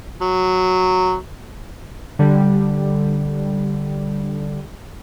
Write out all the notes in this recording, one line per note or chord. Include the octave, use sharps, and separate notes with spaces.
F#3
D3 G3